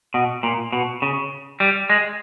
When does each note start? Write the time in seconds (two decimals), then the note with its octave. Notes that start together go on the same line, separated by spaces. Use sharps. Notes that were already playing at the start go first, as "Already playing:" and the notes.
0.14 B2
0.43 A#2
0.73 B2
1.02 C#3
1.60 G3
1.90 G#3